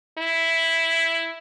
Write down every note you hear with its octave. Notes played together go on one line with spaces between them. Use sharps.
E4